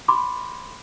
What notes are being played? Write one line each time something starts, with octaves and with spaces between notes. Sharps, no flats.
B5 C6 D6